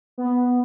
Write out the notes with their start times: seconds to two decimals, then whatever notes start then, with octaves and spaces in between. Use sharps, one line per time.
0.18 B3